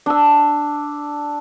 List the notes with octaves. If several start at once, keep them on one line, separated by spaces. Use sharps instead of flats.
D4 E6